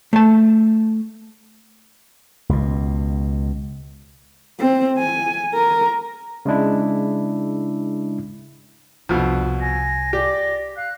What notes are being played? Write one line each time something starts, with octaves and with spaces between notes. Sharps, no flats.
A3 A5
C#2 B2
C4
G#5
A#4
C#3 G#3 D4 E4
C2 F2 B2 D4
G#5 A#6
G4 D5
F5 F#6